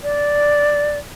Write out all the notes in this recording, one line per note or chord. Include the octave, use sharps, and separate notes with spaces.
D5